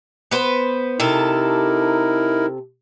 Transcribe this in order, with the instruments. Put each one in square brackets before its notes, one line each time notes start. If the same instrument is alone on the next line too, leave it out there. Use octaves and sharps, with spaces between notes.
[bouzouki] B3 B4 C5
[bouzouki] C3 A4 [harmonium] D#4 E4 A#4